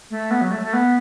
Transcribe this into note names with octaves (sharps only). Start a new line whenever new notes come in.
A3
B3
F#3
A3
A3
B3